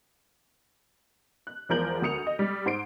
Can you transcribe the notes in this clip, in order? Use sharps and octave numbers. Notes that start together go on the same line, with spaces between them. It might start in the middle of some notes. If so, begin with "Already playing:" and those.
F#6
E2 F3 G#3 A#4 G6 F#7
D2 A#4 D#6 C#7 F7
D#5
G3
G#2 C5 C7 D7